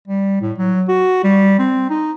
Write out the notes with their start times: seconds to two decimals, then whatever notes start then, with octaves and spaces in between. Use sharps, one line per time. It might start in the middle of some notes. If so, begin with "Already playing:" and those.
0.08 G3
0.41 A2
0.58 F#3
0.88 F#4
1.24 G3
1.58 C4
1.89 D#4